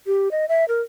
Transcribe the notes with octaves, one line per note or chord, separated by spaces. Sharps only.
G4
D#5
E5
A#4